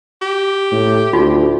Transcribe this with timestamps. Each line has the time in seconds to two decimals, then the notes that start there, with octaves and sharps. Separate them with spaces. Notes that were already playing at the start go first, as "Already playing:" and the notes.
0.22 G4
0.72 A2
1.13 D2 D#4 F4 F#4